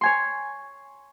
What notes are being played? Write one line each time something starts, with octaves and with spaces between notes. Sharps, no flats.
C#5 G#5 C6